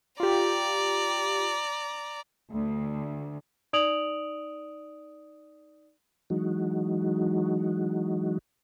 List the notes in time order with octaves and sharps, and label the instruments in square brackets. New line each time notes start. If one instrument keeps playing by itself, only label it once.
[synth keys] F4 G4 [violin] D5 A#5
[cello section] D2
[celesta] D#4 D5 D#6 D7 F7 F#7
[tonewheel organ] E3 F#3 G#3 D#4 F#4